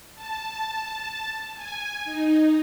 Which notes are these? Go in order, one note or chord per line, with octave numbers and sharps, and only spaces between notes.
A5
G#5
D#4